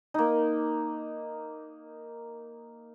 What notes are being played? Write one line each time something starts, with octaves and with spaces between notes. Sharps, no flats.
A#3 D#4